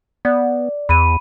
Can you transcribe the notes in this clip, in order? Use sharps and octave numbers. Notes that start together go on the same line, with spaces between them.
B3 D5
E2 B5 D#7